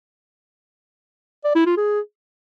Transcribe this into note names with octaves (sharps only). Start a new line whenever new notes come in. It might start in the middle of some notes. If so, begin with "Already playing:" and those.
D5
E4
F4
G#4